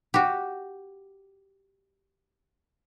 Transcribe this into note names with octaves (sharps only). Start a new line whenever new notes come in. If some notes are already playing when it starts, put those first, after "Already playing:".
F#4 G4